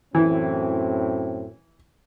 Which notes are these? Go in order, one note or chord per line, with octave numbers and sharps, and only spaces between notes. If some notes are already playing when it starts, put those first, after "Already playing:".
F#2 A2 E3 C4